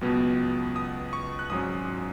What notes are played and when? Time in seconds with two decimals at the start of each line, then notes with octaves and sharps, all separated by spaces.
0.01 C#2 B2 F#3 B3
0.76 D#6
1.13 C#6
1.39 F#6
1.50 G#1 G#2 F#3 C#4 D#6